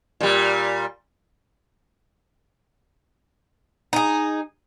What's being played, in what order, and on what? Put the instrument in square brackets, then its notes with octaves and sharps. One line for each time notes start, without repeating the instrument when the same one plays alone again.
[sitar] A#2 G3
[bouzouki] D#4 G#4